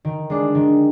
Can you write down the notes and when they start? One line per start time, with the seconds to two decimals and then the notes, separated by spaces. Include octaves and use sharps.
0.05 D#3
0.30 G#3 D4
0.55 D#3